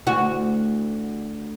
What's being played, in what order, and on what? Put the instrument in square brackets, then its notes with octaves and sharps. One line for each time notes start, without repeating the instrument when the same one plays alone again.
[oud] D2 F#4